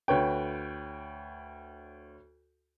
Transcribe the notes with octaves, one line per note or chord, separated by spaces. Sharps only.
D2 B4 C#5 G5